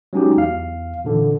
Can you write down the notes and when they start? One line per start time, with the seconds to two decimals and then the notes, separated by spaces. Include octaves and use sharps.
0.13 F#3 G#3 C#4 D#4 F#4 G4
0.37 E2 F5
1.04 A#2 D3 E3